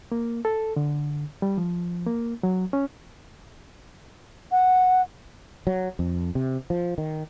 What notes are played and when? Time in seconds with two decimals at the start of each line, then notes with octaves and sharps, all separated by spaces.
0.12 A#3
0.45 A4
0.76 D3
1.42 G3
1.58 F3
2.07 A#3
2.43 F#3
2.73 C#4
4.52 F#5
5.67 F#3
5.99 F2
6.35 C3
6.70 F3
6.98 D#3